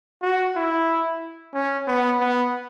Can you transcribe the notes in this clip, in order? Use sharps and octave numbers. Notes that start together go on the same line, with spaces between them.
F#4
E4
C#4
B3
B3